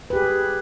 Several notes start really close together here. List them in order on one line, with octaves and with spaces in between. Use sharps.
B4 G4 G#4